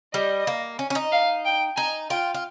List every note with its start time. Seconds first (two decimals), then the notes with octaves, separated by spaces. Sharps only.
0.14 G3 D#5
0.47 A#3
0.79 C#4
0.90 C#4
0.95 D#4
1.12 F5
1.45 G5
1.77 D#4 G#5
2.10 F4 G5
2.34 F4